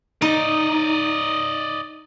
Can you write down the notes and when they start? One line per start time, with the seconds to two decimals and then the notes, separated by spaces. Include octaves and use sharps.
0.22 D#4 D5 D#5